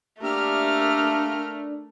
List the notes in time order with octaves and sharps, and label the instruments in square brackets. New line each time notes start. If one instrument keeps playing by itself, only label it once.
[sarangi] A3 [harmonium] A#3 G4 E5 [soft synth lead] D4 [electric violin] A#4 F6